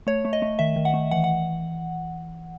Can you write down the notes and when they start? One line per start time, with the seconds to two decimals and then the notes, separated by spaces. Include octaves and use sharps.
0.07 A3 C#5
0.25 A3
0.33 D#5
0.42 A3
0.59 D#3 E5
0.76 D#3
0.85 F#5
0.94 A3
1.11 E3 F#5
1.24 F#5